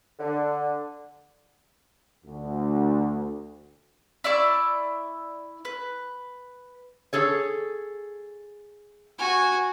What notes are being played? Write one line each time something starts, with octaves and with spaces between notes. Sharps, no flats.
D3
D2
E4 D5 E5 C#6
B4
G#4 A4 C#5
F#4 G#5